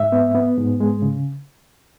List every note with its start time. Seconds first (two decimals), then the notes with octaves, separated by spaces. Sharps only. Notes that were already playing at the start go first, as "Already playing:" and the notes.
Already playing: G#2 E5
0.12 B3
0.35 B3
0.57 G#2
0.80 G#3
1.02 C#3